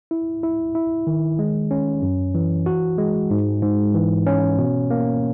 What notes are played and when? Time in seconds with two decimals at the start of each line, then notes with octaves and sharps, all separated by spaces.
0.11 E4
0.43 E4
0.75 E4
1.07 D#3
1.39 G#3
1.71 C#4
2.02 F#2
2.35 E3
2.66 F#4
2.98 G#3
3.31 G#2
3.62 G#2
3.95 E3
4.26 C#4
4.58 B2
4.91 A#3